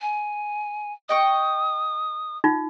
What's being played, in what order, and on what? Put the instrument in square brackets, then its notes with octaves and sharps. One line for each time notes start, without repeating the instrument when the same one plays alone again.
[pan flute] G#5
[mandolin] D#5 G5 C#6 [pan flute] D#6
[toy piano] D#4 F4